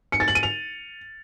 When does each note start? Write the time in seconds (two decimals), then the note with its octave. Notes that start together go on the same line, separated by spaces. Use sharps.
0.12 C#7
0.20 A6
0.28 F#7
0.35 D#7
0.43 F7